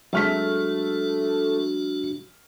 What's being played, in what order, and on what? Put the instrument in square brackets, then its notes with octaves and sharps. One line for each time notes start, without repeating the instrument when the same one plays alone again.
[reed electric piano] F#3 G#3 [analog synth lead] A3 [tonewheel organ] D4 F#4 [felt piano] E5 F6 B6